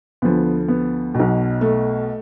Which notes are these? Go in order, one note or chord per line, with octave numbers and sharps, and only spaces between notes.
D2 D3 F3 B3
B3
B2
B1
A3